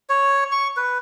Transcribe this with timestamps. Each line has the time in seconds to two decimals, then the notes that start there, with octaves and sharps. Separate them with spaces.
0.10 C#5
0.52 C#6
0.77 B4